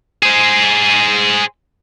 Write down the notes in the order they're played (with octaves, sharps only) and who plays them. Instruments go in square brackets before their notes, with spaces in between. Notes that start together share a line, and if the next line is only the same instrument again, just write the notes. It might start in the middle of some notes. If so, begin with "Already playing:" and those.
[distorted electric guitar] G#4 C5